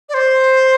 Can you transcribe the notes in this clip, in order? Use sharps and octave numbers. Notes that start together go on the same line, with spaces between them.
D5
C5